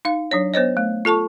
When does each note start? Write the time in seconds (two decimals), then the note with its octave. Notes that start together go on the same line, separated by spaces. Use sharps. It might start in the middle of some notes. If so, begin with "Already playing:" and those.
0.05 D#4 F5
0.31 F#3 D4 C#5
0.54 B3 C5 C#5 D#5
0.77 A3
1.05 F4 A4 A5 C#6